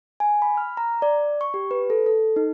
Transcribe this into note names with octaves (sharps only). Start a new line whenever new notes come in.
G#5
B5
F6
A#5
D5
C#6
G4
B4
A4
A4
D#4